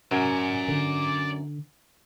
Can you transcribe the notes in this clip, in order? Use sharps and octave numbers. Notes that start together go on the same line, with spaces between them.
F#2 D5 G#5
D3